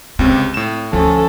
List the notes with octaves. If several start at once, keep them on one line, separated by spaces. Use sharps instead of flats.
C#2 C3 C4
A2 E7
D2 F3 C#4 A4